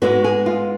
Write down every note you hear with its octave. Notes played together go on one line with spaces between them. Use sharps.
G#2 G#3 B3 F#4
G#4
F4